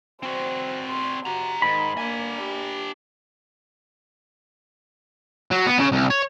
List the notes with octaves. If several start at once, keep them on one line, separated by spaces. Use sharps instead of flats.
C4 F#4 C5
C6
F#4 G4 A#5
G#2 D#3 B5
A#3 D4 G#5
G4
F#3
B3
C#3
C2
C#5